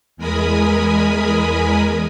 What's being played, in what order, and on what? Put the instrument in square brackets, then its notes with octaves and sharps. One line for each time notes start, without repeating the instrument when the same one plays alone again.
[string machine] E2 G#3 A#4 G#5 B5 D#6